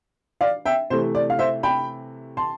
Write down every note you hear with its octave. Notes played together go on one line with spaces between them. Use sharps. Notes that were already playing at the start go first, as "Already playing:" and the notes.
D5 F5
E5 G5
C3 E3 A3 C5
D5
F5
C5 E5
G5 B5
A5 C6